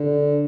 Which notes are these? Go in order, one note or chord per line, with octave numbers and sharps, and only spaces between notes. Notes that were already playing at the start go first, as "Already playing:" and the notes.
Already playing: D3